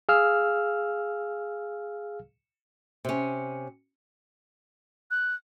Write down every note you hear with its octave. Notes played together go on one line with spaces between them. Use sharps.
G#4 F5 E6 F6
C3 C#4
F#6